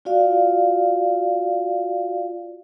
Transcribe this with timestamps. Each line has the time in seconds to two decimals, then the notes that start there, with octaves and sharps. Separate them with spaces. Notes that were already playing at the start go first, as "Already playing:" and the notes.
0.05 F4 F#4 D5 F5